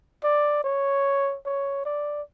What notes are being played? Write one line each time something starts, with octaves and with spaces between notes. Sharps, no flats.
D5
C#5
C#5
D5